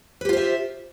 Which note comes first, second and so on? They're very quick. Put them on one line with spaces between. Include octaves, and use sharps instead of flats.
B4 G4 F4 C5 E5